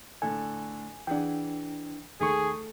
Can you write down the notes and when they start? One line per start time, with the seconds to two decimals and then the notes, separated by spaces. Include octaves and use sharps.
0.22 A2 D3 A4 G#5
1.07 E3 D4 G#4 F#5 G5
2.21 D#2 D#3 A3 G#4 C#6